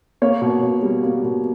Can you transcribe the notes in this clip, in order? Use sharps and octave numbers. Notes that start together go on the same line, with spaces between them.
A#3 C#5
B2
B2
G3
A#3
B2